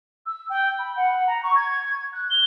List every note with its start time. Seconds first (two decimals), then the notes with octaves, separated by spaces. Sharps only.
0.26 E6
0.49 G5
0.79 B5
0.96 F#5
1.27 A#5
1.43 C#6
1.56 G#6
1.72 G#6
1.91 G#6
2.13 F#6
2.30 G7